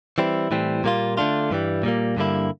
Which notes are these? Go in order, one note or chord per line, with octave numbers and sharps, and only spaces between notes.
E3 G3 C4 E4
A2 E3 G3 C4
A#2 G3 A#3 F4
D3 A3 D4 F4
G2 E3 G3
A#2 G3 A#3
G2 D3 G3 A#3 E4